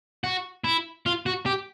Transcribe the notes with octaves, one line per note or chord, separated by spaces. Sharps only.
F#4
E4
F4
F#4
G4